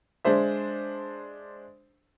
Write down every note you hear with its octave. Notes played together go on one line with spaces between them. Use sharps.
G#3 D4 C5 E5